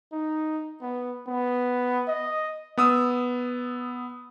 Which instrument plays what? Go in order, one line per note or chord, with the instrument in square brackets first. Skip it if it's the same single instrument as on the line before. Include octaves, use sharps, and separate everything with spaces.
[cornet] D#4
B3
B3
D#5
[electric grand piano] B3 D#6 E6